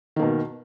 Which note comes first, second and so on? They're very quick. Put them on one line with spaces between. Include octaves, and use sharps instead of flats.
D#3 A#3 B2